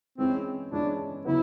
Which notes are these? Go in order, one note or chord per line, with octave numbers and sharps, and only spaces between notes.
E3 G#3 C4 C#4 E4 G#4
E3 G#3 C#4 D4 E4 G#4
C#3 F#3 B3 E4